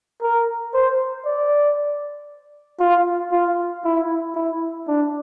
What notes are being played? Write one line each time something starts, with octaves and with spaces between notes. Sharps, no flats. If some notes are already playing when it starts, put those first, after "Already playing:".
A#4
C5
D5
F4
F4
E4
E4
D4